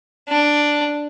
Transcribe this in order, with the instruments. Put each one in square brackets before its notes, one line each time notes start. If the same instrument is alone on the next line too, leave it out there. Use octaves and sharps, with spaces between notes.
[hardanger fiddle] D4